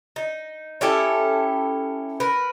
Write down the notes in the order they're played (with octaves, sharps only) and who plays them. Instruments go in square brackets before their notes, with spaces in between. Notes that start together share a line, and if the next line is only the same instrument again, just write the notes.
[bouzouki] D#4
C#4 E4 G4 A4
A#4 B4